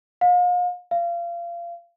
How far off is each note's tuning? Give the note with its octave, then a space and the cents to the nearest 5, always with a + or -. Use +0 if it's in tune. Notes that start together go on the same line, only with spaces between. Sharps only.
F5 +40
F5 -25